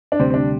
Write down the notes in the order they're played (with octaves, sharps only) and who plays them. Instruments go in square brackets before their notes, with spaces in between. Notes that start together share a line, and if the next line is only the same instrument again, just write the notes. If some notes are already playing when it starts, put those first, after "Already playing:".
[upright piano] D4
[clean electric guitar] D2 C3 G3 [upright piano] C4
[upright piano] C4
D4